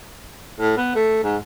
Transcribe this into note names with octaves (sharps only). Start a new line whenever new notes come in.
A2
B3
A3
G#2